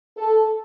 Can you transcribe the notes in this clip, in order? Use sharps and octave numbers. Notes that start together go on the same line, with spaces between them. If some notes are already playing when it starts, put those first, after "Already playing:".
A4